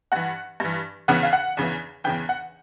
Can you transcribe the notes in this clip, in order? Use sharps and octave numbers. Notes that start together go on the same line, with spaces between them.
G2 E3 F#5
G2 E3
E2 C#3 E3 F#5
F5
F#5
E2 C#3 E3
E2 C#3 E3 G5
F#5